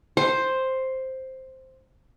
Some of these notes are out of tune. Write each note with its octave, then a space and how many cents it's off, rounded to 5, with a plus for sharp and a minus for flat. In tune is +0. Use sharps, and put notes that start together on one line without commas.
C5 +5